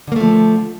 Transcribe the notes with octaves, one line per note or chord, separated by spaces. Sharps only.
D3 F3 A3 A#3